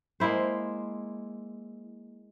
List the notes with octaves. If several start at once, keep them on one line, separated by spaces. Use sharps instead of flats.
G#3 A#3 E4 C5